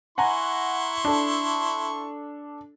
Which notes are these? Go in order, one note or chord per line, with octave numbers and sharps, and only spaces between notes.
E4 F#5 G#5 A#5 C6 C#6
D4 A4